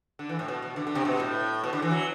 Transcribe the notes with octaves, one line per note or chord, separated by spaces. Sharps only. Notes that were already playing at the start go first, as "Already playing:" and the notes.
D3
E3
A2
B2
B2
D3
D3
C3
B2
A2
B2
D3
E3
F#3